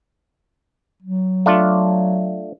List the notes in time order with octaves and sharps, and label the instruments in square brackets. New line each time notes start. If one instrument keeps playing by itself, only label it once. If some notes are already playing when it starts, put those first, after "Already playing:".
[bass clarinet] F#3
[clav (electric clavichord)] A3 D4 F4